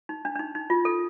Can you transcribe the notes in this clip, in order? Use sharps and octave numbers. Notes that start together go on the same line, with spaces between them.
D#4
D4
D4
D#4
D#4
F4
A4